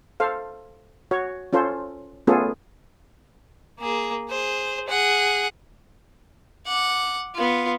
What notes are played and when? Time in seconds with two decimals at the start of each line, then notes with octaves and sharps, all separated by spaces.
0.20 A4 C5 F5
1.11 F#4 C#5
1.53 C#4 F4 A4 C5
2.27 A3 B3 C#4 F4 G#4 A4
3.80 A#3 G#4
4.29 G#4 C5
4.87 G#4 F#5
6.66 F#5 D6
7.35 B3 F4